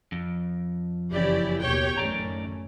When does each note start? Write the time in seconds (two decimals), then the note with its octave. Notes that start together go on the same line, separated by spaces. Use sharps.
0.12 F2
1.11 F#1 E3 C#4 E4 G4 D5
1.61 D#2 B2 G4 C#5 G5
1.97 A1 F#2 D#3 A3 C#4 D5 A#5